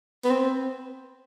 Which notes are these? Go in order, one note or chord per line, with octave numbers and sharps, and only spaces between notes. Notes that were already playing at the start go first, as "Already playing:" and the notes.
B3
C4